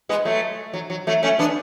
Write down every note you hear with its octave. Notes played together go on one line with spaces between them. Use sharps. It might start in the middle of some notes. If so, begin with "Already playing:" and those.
G#3 B3
F#3 A3
F#3
F#3
F#3 A3
A3 C#4
B3 D4